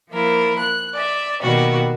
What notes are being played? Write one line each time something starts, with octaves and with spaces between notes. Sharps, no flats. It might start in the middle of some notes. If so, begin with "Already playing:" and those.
F3 A#3 E4 A#4
F#6
D5 E5
B2 D#3 G3 A#3 F#4